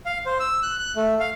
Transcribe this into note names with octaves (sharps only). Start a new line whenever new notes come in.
F5
C5
E6
F#6
F#6
A3
F5